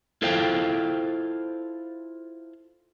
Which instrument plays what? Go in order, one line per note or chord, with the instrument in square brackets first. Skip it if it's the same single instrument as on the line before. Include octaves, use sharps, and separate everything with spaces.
[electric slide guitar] E4 F4 A4 C5 F5 G5